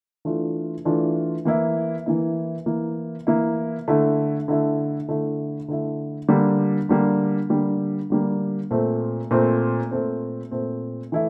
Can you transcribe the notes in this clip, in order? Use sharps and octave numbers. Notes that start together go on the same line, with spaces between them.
E3 A3 D4 F4
E3 A3 D4 F4
E3 A#3 E4
E3 A#3 E4
E3 A#3 E4
E3 A#3 E4
D3 A3 E4
D3 A3 E4
D3 A3 E4
D3 A3 E4
D3 G3 A#3
D3 G3 A#3
D3 G3 A#3
D3 G3 A#3
A#2 A3 C4
A#2 A3 C4
A#2 A3 C4
A#2 A3 C4
E3 A3 E4